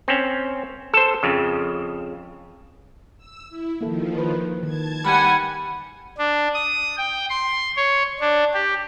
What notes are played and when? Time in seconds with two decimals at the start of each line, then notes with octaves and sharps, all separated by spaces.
0.08 C4 C#4
0.94 A4 C5
1.23 F2 C#3
3.18 E6
3.49 E4
3.81 D#3 F3 A#3 E4 A4
4.18 B4
4.63 D#3 A5 G#6
5.05 G3 F#5 G#5 B5
6.18 D4
6.54 D#6
6.98 G5
7.30 C6
7.76 C#5
8.20 D4
8.54 G4